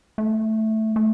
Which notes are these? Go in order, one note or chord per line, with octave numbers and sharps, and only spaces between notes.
A3
A3